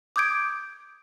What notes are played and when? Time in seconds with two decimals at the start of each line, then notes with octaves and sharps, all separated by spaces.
0.16 D6 D#6 G6 G#6 D7